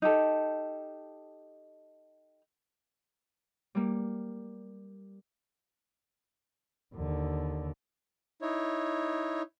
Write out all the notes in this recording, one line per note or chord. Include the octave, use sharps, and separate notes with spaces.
D#4 G4 A4
G3 A#3
D#2 D3
D#4 E4 C#5